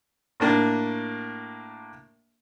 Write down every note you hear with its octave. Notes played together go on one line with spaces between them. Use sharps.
A2 A#3 D4